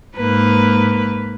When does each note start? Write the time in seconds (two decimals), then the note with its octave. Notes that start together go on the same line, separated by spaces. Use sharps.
0.17 G#2 A#3 B4